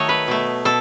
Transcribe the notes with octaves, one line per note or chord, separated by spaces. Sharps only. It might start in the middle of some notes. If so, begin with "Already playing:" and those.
Already playing: D#3 F#3 A3 A4 C#5 D#5
B4
B2 A3
B2 A4